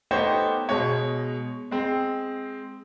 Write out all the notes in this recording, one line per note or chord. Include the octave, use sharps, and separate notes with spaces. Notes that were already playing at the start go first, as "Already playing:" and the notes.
A3 B3 D#4 G4 C5 C#5
B2 G#3 C#5
G#3 C4